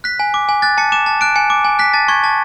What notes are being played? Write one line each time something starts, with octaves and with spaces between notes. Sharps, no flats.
F#6 B6
G#5
D6
G#5
F#6 A6
A5 C#7
D6 E7
A5
F#6 D7
G#5 C#7
D6
G#5
F#6 B6
A5 A6
C#6 G#6
A5